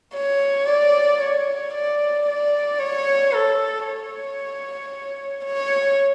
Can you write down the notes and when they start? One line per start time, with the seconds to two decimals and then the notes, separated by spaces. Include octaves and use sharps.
0.14 C#5
0.67 D5
1.20 C#5
1.74 D5
2.26 D5
2.79 C#5
3.33 A4
3.86 C#5
5.45 C#5